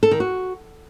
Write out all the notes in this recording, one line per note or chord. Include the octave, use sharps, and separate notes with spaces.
A4
D#3
F#4